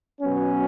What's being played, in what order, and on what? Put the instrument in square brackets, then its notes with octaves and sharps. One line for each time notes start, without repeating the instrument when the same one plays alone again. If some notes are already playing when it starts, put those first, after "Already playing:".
[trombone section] B2 F#3 B3 C#4